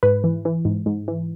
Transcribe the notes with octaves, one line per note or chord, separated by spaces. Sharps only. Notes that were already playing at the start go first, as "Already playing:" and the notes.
G#2 B4
E3
E3
G#2
G#2
E3